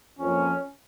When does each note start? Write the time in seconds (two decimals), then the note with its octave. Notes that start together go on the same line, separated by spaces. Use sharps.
0.18 F2 F3 A#3 C#4